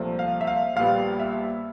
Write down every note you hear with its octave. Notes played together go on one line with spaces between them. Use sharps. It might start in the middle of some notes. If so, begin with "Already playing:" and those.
Already playing: C2 A#2 F3 A3
F5
E5
F5
A#1 A#2 G3 B3 F5
E5